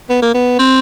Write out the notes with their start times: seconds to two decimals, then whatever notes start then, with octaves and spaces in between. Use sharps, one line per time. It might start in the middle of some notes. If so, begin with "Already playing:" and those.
0.10 B3
0.22 A#3
0.34 B3
0.59 C4